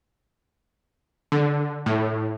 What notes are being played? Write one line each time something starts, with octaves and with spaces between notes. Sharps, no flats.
D3
A2